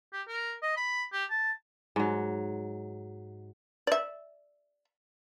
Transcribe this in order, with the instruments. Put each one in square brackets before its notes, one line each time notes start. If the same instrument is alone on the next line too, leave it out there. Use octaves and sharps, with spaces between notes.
[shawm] G4
A#4
D#5
B5
G4
A5
[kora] G#2 F#3
[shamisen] D5 E5